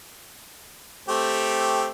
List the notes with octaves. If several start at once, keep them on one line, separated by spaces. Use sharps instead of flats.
A3 C4 G4